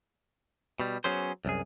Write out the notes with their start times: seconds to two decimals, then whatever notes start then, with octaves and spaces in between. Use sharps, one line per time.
0.80 B2 G3
1.04 F#3 B3 C#4 G#4 C5
1.45 C2 F#2 G#4